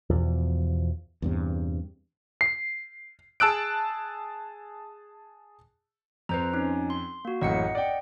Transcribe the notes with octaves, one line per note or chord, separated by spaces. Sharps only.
E2 B2 F3
E2 G2 C3
C7
G#4 A5 E6 F#6 D7
F2 B4 C5 A#5
C#4 D#4
C6
A#3 F#4
A1 F#2 A2 D#5 F#5 C#7
D5 G5